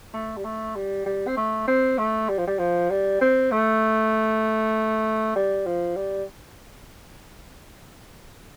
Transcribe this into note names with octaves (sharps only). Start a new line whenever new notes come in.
A3
G3
A3
G3
G3
C4
A3
C4
A3
G3
F3
G3
F3
G3
C4
A3
G3
F3
G3